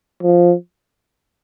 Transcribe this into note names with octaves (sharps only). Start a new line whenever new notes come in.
F3